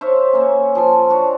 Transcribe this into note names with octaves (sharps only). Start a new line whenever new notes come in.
C5 C#5 E5 F5
A#3 C#4
F3 G5 A5 C6
D4 F#4 C#5